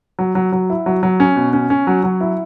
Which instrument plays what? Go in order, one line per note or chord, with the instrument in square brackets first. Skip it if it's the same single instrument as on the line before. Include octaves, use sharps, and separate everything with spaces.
[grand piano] F#3
F#3
F#3
E4
F#3
F#3
C#4
B2
C#4
C#4
F#3
F#3
E4